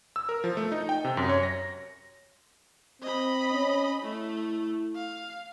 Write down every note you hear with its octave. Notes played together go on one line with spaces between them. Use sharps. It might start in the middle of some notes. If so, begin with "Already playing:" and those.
E6
A#4
F3
A3
D#4
G5
C3
F#2
C#5
A#6
C4 D#5 B5
C#4
A3 E4
F5